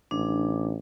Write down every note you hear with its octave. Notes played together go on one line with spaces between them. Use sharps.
A1 D4